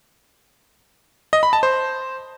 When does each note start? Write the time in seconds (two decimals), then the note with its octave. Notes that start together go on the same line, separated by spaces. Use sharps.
1.33 D#5
1.43 B5
1.53 A5
1.63 C5